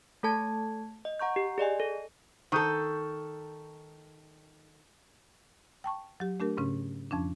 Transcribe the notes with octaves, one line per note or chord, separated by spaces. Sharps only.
A3 A4 A5 G#6
D#5
F#5 A#5 C#6 G6
G4
G#4 D5 D#5 G#5
A4
D#3 A4 C#6 D#6 G6
G5 A5 C#6
F#3 G4
A3 D4 G4 A#4
G#2 C#3 C#4
F2 F3 C#4 D4